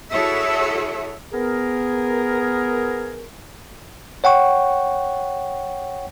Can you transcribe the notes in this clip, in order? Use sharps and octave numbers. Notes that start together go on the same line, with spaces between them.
E4 F#4 G#4 A4 C#5 E5
B3 G#4 A#4
C#5 F#5 G5 C#6